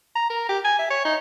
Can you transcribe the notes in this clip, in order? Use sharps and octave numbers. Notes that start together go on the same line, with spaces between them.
A#5
A#4
G4
G#5
E5
C#5
D#4